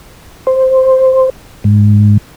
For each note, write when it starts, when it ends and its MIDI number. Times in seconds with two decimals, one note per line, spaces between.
0.47 1.30 72
1.64 2.17 44